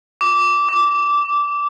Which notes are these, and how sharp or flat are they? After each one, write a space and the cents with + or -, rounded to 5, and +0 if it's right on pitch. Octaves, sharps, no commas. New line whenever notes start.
D6 -15
D6 -10